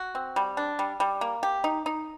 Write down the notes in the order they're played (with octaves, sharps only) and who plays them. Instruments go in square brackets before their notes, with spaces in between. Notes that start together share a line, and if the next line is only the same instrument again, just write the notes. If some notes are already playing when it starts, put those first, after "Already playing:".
Already playing: [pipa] F#4
C4
G3
D4
G3
G3
A#3
G4
D#4
D#4